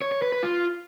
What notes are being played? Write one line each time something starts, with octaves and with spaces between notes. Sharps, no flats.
C#5
C#5
B4
B4
F4